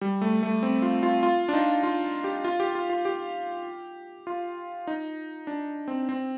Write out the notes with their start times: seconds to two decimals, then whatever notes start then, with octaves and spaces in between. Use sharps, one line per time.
0.01 G3
0.21 A3
0.43 A3
0.63 C4
0.82 F4
1.03 F4
1.23 F4
1.49 D4
1.53 D#4
1.83 F4
2.24 G4
2.44 F4
2.60 G4
2.75 F4
2.89 F4
3.05 G4
4.27 F4
4.87 D#4
5.47 D4
5.88 C4
6.09 C4